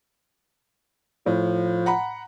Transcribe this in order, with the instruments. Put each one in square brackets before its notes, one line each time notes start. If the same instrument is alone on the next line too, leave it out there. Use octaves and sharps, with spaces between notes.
[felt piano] A2 [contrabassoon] F3
[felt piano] F#5 A#5 B5